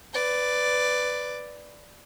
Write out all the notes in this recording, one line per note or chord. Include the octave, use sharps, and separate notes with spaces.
B4 D5